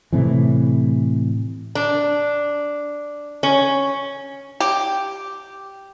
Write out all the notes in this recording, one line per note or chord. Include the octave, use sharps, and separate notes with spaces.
A2 C3 E3
D4
C#4
G4